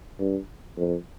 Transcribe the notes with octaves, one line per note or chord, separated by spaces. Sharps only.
G2
F2